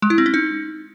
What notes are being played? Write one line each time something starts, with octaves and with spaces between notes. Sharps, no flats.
G#3
E4
C4
C#4
D#4